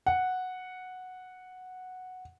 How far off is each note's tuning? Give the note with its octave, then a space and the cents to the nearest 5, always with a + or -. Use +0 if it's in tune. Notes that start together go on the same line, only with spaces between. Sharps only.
F#5 -5